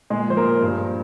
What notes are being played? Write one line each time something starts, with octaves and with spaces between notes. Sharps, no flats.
A#2 G#3 G#4
F3 C5
A#3 A#4
A#2
G2